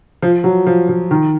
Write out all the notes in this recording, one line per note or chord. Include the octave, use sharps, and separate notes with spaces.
F3
F#3
F3
F3
D#3